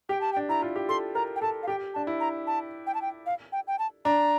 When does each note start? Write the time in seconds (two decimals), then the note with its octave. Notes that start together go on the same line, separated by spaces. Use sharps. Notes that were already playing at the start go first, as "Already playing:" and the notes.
0.09 G4 G5
0.21 A5
0.33 G5
0.37 D4
0.49 E4 A#5
0.62 F4
0.76 G4
0.89 A4 C6
1.15 A#4 A#5
1.36 G5
1.42 A4 A5
1.63 F5
1.68 G4 G5
1.94 D4 A5
2.07 E4
2.20 A#5
2.47 A5
2.87 G5
2.94 A5
3.02 G5
3.26 F5
3.52 G5
3.67 G5
3.79 A5
4.05 D4 A#5